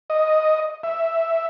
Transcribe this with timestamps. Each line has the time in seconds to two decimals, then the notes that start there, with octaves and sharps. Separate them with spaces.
0.10 D#5
0.83 E5